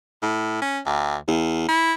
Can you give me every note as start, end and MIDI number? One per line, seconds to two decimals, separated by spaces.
0.23 0.58 45
0.62 0.79 61
0.86 1.16 38
1.28 1.68 40
1.69 1.93 64